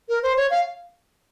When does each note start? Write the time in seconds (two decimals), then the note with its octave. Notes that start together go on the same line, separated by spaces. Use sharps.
0.09 A#4
0.23 C5
0.37 C#5
0.51 F5